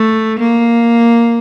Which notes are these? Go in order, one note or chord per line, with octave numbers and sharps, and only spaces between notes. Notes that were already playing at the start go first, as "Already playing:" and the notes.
Already playing: A3
A#3